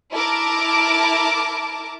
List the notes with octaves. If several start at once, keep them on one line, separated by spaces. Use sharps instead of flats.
E4 A#4 A5 D6